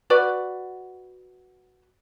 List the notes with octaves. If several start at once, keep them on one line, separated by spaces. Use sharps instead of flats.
F#4 B4 D5